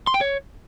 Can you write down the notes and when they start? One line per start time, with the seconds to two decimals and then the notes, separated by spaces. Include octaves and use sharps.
0.07 C6
0.14 G5
0.21 C#5